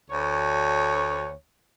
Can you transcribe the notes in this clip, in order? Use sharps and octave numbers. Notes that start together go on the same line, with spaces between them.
D2 C#5